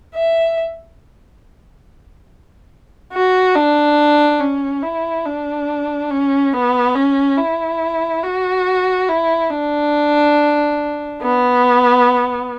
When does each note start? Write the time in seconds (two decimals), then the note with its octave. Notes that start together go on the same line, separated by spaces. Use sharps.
0.15 E5
3.13 F#4
3.55 D4
4.40 C#4
4.83 E4
5.26 D4
6.11 C#4
6.53 B3
6.96 C#4
7.38 E4
8.24 F#4
9.09 E4
9.51 D4
11.22 B3